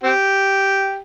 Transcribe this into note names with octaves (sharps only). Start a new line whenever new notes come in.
C4 G4